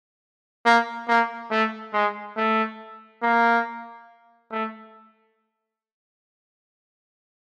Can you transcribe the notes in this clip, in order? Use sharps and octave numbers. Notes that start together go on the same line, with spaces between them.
A#3
A#3
A3
G#3
A3
A#3
A3